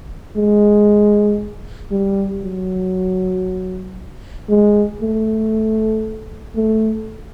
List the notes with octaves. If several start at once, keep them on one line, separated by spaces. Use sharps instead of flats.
G#3
G3
F#3
G#3
A3
A3